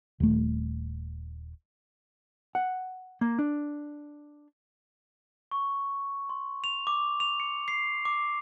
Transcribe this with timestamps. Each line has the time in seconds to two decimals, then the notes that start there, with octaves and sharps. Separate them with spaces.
0.20 D#1 A3
2.55 F#5
3.21 A#3
3.39 D4
5.51 C#6
6.29 C6
6.64 F7
6.87 D6
7.20 F7
7.40 C#7
7.68 C7
8.05 D6